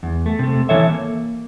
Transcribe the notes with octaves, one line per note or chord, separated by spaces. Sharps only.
E2
A3
C3 A3
E3 A4 C#5 E5
A#3